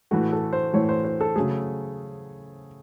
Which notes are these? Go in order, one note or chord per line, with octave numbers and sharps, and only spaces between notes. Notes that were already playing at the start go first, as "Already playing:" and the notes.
A2 E3 A3 F#4
A4
C5
A2 E3 A3 C#5
C5
C5
A4
C#3 F#3 A3 G#4